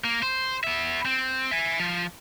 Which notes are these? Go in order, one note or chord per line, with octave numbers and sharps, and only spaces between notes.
A#3
C5
B3 E5
C4
E5 G#5
F3